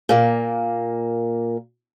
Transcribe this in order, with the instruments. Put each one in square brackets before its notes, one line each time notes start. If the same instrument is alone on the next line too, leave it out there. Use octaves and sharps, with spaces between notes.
[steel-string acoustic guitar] A#2 A#3